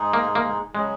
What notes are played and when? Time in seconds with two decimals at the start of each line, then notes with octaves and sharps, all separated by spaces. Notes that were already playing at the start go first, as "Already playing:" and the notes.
Already playing: G#2 G#3 D#4 G#4
0.13 A#3
0.35 A#3
0.74 C#3 F#3 G#3 C#4 G#4